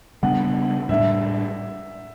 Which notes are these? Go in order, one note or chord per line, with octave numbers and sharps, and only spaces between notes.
C#3 G3 B3 D4 F#5
A2 G3 D4 E5